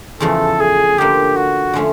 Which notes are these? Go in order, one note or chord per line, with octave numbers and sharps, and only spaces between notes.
E2 C#3 F3 A3 A4
G#4
D3 F3 A#3 G4
F#4
D3 F3 A3 C#4